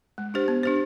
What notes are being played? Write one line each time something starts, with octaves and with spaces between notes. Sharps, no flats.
G#3
D4 G4 C5
B3
D4 G4 C5